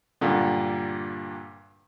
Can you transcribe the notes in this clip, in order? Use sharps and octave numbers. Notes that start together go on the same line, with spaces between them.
G2 A#2 D3